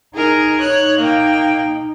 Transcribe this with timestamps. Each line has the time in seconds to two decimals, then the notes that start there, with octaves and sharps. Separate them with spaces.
0.14 D#4 G#4 A#4
0.60 D#4 C#5 F#6
0.99 A#3 G5